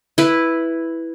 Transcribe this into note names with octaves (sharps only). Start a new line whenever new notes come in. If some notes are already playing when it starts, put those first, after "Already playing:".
E4 B4